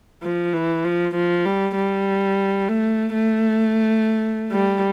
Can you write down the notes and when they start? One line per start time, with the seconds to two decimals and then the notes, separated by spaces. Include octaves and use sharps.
0.23 F3
0.54 E3
0.84 F3
1.15 F3
1.45 G3
1.76 G3
2.69 A3
3.14 A3
4.52 G3